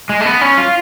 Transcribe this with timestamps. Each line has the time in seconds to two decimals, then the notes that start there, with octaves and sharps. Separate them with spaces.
0.09 G#3
0.21 A3
0.26 B3
0.41 C#4
0.58 F4